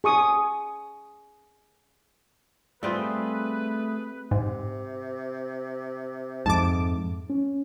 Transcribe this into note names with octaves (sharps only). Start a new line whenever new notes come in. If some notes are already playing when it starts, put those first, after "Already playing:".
G#4 C#6 D#6
G3 A3 C4 F4 G#4 B4
G#2 C3
F2 G#2 A5 D6
C#4